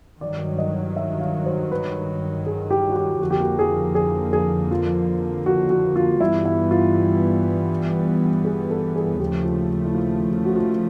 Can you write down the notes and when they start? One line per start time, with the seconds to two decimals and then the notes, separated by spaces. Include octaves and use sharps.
0.21 G2 D#3 F#3 D5
0.59 D#5
0.96 E5
1.20 F5
1.46 C5
1.71 B4
2.47 G#4
2.71 G4
2.90 F#4
2.96 G4
3.21 F2 D3 F3 A#3 F#4
3.31 G4
3.40 F#4
3.59 G#4
3.95 G#4
4.33 G#4
4.71 F4
5.46 F#4
5.70 F#4
5.96 F4
6.20 G2 E3 G3 B3 E4
6.45 E4
6.71 F4
8.45 G#4
8.70 A4
8.96 G#4
9.19 D#2 C#3 F3 A3 G4
9.44 F4
9.86 E4
9.94 F4
10.33 F4
10.45 F#4
10.56 F4